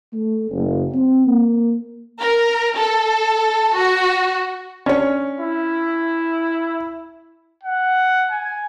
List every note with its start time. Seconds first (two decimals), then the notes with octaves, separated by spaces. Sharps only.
0.14 A3
0.50 F#1
0.92 C4
1.26 A#3
2.21 A#4
2.76 A4
3.76 F#4
4.86 C#4 D4 C#5
5.40 E4
7.63 F#5
8.31 G#5